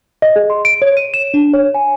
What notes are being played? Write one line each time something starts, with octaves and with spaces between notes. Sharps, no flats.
D#5
G#4
C6
D7
C#5
D#7
E7
D4
C#5
G#5